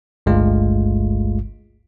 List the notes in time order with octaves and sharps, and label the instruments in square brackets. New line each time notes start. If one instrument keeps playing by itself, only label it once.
[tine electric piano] G1 C#2 G2 G#3 A3 F4